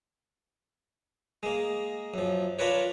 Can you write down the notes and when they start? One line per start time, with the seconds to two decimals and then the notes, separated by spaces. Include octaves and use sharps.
1.43 G#3 A#3
2.14 F#2 F3
2.59 D4 F4 A#4 B4 C#5